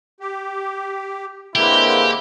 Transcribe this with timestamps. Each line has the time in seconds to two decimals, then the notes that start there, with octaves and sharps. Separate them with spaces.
0.20 G4
1.55 D3 G#3 A#3 C4 E4 G4 B4